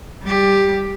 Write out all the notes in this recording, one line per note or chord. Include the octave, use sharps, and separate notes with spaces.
G3 G4